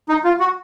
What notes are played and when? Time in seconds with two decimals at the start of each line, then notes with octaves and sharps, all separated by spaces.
0.09 D#4
0.24 F4
0.40 F#4